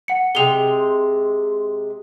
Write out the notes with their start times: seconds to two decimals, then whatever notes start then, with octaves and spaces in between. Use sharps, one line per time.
0.08 F#5 C#7
0.35 C3 G#3 G5 F7 G7